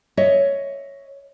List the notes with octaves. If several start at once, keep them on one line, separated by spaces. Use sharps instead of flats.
C#5 D#5 E5